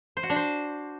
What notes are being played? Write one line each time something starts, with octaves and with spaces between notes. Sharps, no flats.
C5
F#4
D4
C5